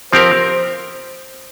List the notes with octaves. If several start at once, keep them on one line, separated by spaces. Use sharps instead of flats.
F3 C4 G4 A#4 C5